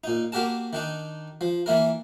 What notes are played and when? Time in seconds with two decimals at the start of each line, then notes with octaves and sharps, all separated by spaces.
0.04 A#2 D#4
0.32 A#3 F#4 G4 A#4 A5
0.73 D#3 D4 D#4
1.41 F3
1.66 E3 A#3 E4 A#4